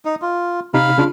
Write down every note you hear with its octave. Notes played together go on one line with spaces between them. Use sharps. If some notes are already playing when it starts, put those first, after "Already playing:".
D#4
F4
C3 D#4 F5 B5
C#3 D4 F4